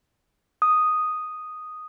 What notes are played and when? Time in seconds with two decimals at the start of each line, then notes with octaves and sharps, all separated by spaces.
0.62 D#6